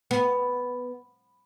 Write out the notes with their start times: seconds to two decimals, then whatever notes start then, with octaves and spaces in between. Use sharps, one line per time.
0.11 B3